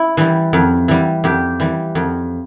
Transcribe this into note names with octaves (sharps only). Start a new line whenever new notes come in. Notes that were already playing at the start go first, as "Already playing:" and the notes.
Already playing: E4
E3 G3
F2
E3 G3
F2 G4
E3 G3
F2